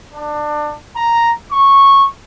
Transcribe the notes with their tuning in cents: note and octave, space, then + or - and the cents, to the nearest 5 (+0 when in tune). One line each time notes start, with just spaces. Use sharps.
D4 +25
A#5 +0
C#6 -10